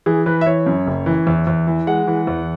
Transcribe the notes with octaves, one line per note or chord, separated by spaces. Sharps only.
E3 G#4
E3 B4
E5
E3 C#5
F#2
F#1
E3
E2
E2
E3
G#3 F#5
E3
E2